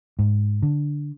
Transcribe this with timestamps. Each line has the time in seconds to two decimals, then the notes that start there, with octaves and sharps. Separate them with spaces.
0.19 G#2
0.62 D3